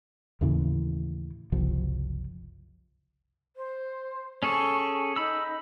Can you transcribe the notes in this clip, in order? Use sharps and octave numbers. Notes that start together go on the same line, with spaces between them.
D#2 A2 C#3 E3
F#1 C2 F3
C5
C#4 G#4 A4 C#6
D#4 B5 E6